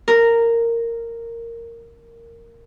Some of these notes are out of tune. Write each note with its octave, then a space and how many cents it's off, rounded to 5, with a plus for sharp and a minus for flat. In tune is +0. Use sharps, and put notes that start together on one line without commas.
A#4 -10